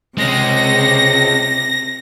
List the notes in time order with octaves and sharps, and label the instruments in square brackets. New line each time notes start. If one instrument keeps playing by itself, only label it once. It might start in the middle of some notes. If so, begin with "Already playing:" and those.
[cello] C3 [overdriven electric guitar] G#3 C#4 [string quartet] A#6